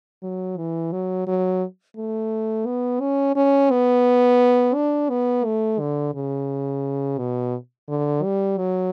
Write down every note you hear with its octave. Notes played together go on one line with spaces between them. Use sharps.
F#3
E3
F#3
F#3
A3
B3
C#4
C#4
B3
D4
B3
A3
D3
C#3
B2
D3
G3
F#3